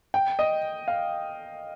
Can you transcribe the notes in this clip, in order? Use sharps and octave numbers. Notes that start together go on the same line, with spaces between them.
G5
D#5
F5